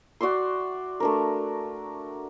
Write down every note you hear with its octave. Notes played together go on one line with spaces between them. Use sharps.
F#4 D5 E5 C6
A3 D4 A#4